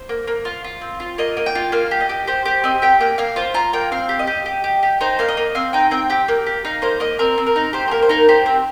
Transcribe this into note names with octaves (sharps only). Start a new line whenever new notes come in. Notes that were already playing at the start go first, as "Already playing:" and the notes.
Already playing: C5
A#3
A#3
F4
F4
C4
F4
A#3 D#5
A#3
G5
F4
A#3 F5
G4
D#5
G4
G4 C5
G4 C5
C4 D#5
G4 G5
A#3 G5
A#3 F5
F4 C5
F4 A#5
A#3 G5
C4 F5
G4
D#5
G4
G4
G4
G4
D#4 C5
A#3 F5
D#5
A#3
C4 F5
D#4 G5
C4 G5
G4 G5
A#3
G4
D#4 F5
A#3 C5
A#3 D#5
C4 A#4
C4
A#4
D#4
G4 C5
C5
A#3 A#4
C5
D#4 A#4
G4 C5
C4